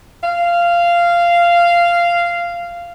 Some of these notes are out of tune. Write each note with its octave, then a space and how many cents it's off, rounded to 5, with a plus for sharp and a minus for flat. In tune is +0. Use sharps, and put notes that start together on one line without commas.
F5 -15